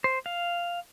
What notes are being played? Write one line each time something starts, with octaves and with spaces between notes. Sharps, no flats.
C5
F5